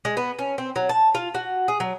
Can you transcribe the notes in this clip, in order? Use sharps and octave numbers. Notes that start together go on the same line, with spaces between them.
G#3
B3
C#4
C4
F#3
A5
F4
F#4
G#4
F#3